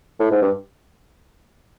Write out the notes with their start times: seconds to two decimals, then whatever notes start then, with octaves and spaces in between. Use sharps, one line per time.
0.20 A2
0.31 G#2
0.42 G2